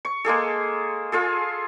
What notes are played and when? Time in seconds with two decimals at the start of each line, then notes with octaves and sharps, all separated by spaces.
0.05 C#6
0.25 G#3 A#3 G#4 A4
1.12 F4 G#4 A4